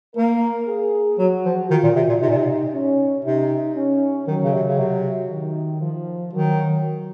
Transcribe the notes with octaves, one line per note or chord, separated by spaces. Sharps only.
A#3 A#4
G#4
F#3 F#4
F3
D#3 F4
A#2
C3
A#2
C3 D#4
A#2
C3
C#4
C3 D#4
C#4
D#3 F#3
C#3
C3
C#3
C3
D#3
F3
D#3 F#3